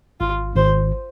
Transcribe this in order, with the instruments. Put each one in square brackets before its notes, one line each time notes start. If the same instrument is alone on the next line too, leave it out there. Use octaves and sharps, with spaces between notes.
[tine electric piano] G#1 [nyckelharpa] F4
[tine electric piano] G#1 [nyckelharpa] C5